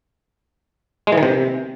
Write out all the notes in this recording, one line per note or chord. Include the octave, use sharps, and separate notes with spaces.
G#3
E3
D#3
C3